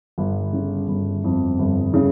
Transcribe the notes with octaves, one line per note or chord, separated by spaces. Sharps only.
G1
C#3
G1
F2
G1
C#3